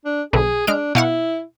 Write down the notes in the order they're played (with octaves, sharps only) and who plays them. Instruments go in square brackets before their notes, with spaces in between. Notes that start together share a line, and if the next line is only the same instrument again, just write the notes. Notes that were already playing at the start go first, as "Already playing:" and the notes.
[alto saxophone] D4
[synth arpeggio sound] B1 D3 B4 [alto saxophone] G#4
[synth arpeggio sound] G#3 F6 D7 [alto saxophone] D4
[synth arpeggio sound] B2 F5 F#5 [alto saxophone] E4